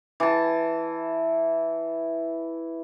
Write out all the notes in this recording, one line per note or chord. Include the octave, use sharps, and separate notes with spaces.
E3 A5